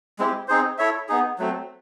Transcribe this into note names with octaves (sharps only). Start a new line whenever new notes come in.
G#3 C4 E4 G4
C4 D#4 G#4 C5
E4 A4 C#5 E5
B3 D#4 G#4
F#3 A3 C4